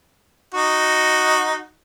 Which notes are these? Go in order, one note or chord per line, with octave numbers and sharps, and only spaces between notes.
D#4 F#4